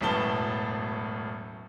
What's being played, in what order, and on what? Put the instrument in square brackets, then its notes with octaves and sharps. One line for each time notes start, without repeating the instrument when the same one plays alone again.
[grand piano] E1 F#2 A2 B3 A5 G7